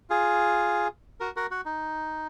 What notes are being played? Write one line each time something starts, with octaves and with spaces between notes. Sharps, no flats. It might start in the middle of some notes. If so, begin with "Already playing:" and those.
F4 G#4
F#4 A#4
F#4 A#4
F#4
D#4